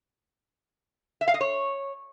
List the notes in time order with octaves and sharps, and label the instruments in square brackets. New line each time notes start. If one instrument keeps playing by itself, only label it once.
[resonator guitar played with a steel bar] E5
F5
D#5
C#5